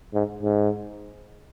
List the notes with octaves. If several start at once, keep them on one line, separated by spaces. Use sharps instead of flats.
G#2
G#2